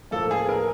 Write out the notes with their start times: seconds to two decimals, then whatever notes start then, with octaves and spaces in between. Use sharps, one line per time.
0.11 A2 F3 A#3 A4
0.31 G#4
0.49 A#4